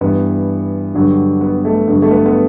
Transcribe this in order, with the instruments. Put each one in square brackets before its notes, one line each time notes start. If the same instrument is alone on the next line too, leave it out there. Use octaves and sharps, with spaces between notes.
[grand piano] G2 E3 B3
G2 D3 F#3
B3
A3
G2 D3 F#3 B3
A3
B3
B3